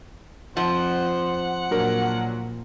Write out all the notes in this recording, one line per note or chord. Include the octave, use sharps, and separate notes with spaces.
F2 F3 C5 F#5
A#2 F#3 D4 A#4